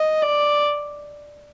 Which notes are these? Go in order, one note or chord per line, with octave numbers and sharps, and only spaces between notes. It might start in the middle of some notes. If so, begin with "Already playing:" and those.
Already playing: D#5
D5